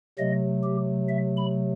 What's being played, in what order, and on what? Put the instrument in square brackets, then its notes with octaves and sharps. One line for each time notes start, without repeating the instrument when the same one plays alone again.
[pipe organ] C3 F#3 A3 D#5
G4
E5
B5